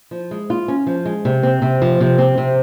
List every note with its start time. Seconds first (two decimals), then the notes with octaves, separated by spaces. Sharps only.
0.11 F3
0.31 G#3
0.50 F4
0.68 C#4
0.87 F3
1.05 G#3
1.25 C3
1.43 C4
1.62 C3
1.82 F3
2.00 C3
2.18 C4
2.37 C3